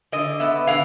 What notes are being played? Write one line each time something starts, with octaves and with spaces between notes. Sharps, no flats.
D3 D#5
B3 E5
D3 F5